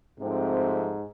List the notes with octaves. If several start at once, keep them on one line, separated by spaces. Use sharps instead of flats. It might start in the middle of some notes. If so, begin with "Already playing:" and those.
G#2 C3 F3 A3 C4